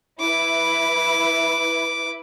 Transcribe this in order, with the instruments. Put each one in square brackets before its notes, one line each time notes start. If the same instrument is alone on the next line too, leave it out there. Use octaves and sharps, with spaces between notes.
[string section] E4 B4 [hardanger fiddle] D6